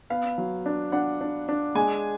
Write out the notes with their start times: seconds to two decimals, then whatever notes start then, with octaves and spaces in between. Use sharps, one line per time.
0.10 B3 F5
0.38 F#3
0.66 D4
0.92 D4 F#5
1.21 D4
1.49 D4
1.75 G#3 G#5